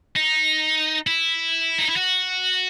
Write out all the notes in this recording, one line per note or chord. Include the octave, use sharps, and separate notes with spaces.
D#4
E4
D#4
E4
F#4